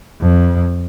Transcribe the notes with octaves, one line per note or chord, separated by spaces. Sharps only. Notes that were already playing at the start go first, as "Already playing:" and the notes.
F2